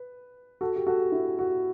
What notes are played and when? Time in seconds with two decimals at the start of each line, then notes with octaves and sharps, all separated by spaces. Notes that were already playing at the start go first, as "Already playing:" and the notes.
Already playing: B4
0.61 F#4 A4
0.76 G4
0.86 F#4 A4
1.12 E4
1.39 F#4